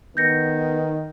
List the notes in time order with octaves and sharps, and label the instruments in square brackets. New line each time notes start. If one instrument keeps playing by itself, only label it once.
[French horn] D#3 [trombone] B3 [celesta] G6 A#6 C#7